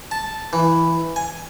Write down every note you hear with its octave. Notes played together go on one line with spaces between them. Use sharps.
A5
E3
G#5